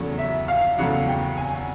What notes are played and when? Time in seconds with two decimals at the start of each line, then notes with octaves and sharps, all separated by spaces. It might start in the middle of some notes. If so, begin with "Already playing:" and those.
Already playing: E2 C#3 F#3 A3
0.18 E5
0.48 F5
0.78 E2 C#3 F#3 A3 F#5
1.08 G5
1.38 G#5